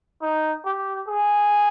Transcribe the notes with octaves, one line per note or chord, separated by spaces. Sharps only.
D#4
G4
G#4